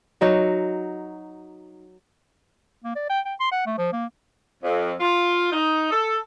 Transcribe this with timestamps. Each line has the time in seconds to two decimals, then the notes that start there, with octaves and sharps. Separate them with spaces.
0.21 F#3 D#4 F#4
2.84 A#3
2.96 D5
3.10 G5
3.25 G5
3.40 C6
3.52 F#5
3.66 A3
3.78 F3
3.92 A#3
4.63 F2
5.00 F4
5.52 D#4
5.91 A4